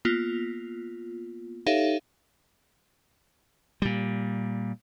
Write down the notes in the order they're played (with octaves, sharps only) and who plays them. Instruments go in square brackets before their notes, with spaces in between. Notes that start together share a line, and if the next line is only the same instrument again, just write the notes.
[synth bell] A#3 B3 F4
D#4 G4 A4 C#5 E5 F5
[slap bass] A#2 G3